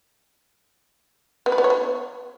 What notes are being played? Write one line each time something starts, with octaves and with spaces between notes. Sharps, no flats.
B3
B4
B3
C#5
B3